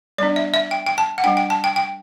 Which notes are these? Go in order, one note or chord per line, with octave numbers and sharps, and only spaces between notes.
G3 B3 D4 D5
E5
E5
G5
G5
A5
F#5
G3 D4 G5
G5
A5
G5
G5